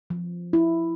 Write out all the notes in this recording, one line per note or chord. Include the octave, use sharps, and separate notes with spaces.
F3
E4